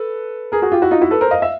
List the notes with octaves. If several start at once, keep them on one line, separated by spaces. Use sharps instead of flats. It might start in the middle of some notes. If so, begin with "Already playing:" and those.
Already playing: A4 B4
G#4 A#4
F#4 G#4
F4 G4
E4 F#4
D#4 F4
E4 F#4
A4 B4
A#4 C5
D#5 F5
E5